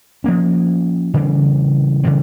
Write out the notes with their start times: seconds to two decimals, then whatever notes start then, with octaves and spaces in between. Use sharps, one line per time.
0.24 F3 A#3 C#4
1.14 C#3 E3 G3 C4
2.03 C#3 E3 G3 C4